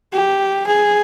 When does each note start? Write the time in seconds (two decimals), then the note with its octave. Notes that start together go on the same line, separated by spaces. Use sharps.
0.13 G4
0.67 G#4